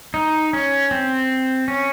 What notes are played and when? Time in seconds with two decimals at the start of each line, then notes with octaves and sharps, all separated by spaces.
0.14 D#4
0.53 C#4
0.91 C4
1.68 C#4